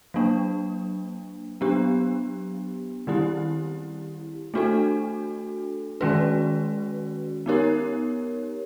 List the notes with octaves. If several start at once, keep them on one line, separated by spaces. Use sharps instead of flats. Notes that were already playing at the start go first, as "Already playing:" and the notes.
F#3 A#3 D4
F#3 B3 D4 G4
D#3 G3 C4 E4 G4
A3 D4 F#4 A4
D#3 G#3 C#4 F#4 B4
B3 D#4 G4 A#4 C#5